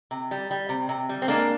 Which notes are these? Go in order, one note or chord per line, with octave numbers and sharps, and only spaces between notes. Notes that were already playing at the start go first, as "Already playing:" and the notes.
C3
G3
G3
C3
C3
G3
C4
G#3 A#3 D4